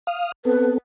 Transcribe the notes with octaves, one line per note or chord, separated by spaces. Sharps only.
F5 D#6 F6
B3 C4 A4 B4